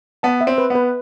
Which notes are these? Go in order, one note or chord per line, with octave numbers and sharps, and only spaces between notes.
B3 A5
E5
C4
B4
B3
B4